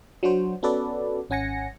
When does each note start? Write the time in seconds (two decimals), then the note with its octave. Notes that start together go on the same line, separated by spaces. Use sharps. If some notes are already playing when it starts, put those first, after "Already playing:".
0.23 F#3 D4 F#4 C5
0.63 B3 C#4 F#4 A4 B4 D5
1.30 G#1 C#4 F#5 G#5 A#6 C#7